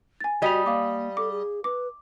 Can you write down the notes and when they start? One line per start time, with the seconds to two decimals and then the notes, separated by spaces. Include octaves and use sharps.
0.20 G#5 A6
0.42 G3 F#4 D#5 G#6 B6 F7
0.66 A#3 D5 F5 D6
1.17 A4 D6
1.32 G#4
1.64 B4 D6